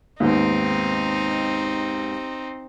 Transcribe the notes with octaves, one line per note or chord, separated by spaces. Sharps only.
D#2 G#2 B3 C4 D#4